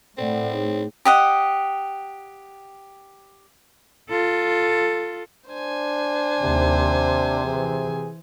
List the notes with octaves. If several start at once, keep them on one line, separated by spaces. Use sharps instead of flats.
A2 C4 A4 D5 F#5
D#4 G#4 C#5
G4 D#5 F#5
F4 A4
D4 C5 G#5
D#2 C3
E3 G#4